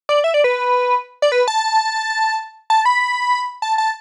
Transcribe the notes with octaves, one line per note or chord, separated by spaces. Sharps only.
D5
E5
D5
B4
D5
B4
A5
A5
B5
A5
A5